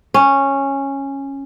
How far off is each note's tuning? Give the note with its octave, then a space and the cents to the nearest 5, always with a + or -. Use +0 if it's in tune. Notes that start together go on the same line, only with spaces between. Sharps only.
C#4 -10